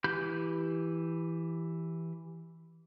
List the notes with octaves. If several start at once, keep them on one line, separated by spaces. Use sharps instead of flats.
E3 G4 B5 G6